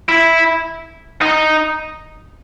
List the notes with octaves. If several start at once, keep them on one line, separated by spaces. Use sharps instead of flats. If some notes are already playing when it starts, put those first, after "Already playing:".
E4
D#4